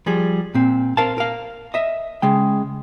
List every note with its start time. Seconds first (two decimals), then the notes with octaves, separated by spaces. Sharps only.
0.06 F3 G3 G#4
0.54 A#2 C4
0.97 A#4 C5 F5 A5
1.18 A#4 F5
1.74 D#5 E5
2.22 C#3 G#3 G5